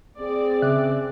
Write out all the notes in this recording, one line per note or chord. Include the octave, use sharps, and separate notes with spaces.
C4 G#4 D5
C#3 E5 F#6